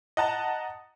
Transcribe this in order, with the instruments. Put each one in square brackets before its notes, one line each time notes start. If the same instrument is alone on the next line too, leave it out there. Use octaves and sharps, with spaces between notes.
[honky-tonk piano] D#5 F#5 A5 A#5